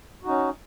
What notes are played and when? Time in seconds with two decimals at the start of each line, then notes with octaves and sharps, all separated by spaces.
0.23 F#4
0.25 D#4
0.28 C#4